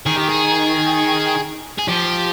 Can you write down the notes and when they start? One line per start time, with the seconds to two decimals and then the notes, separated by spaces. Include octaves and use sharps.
0.06 D#3 G#4
0.17 G4
0.29 G#4
1.78 G#4
1.88 F3 G4